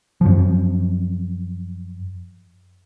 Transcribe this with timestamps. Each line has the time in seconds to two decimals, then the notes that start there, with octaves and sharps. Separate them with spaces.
0.21 F#2 F3